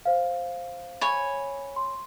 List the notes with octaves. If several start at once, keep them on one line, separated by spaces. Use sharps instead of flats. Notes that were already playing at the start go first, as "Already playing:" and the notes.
C5 F5
C#5 G#5 B5
C6